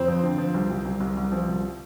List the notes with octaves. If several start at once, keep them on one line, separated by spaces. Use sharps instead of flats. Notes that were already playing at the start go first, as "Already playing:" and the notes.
Already playing: F2 C4
F3
D3
F3
C2
C2
C2
C2
C2
F3
C2